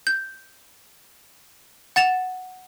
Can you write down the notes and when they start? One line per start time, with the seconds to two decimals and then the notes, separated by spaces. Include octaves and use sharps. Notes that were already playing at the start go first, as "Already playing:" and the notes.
0.07 G6
1.96 F#5 A6 E7 F7